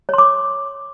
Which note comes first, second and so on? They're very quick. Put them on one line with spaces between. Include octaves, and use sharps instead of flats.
C#5 C6 D6